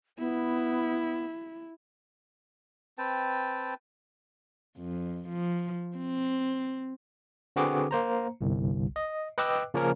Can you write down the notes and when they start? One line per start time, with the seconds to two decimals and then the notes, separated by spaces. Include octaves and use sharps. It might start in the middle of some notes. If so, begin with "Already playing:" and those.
0.19 B3 E4
2.98 C4 B4 G5 A5
4.78 F2
5.28 F3
5.97 C4
7.56 D3 C4 F#4 G#4 B4 D6
7.91 A#3 C5 A#5
8.41 G1 C2
8.96 D#5
9.38 B4 D#5 G5 D6 E6 F#6
9.74 C#3 F3 A#3 C#4 A#4 C#5